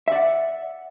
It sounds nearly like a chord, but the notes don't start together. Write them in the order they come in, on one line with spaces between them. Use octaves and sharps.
E5 D5 F#5